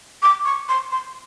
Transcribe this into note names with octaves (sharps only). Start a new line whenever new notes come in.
D6
C#6
C6
C6